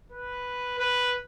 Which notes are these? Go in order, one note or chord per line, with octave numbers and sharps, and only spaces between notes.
B4
B4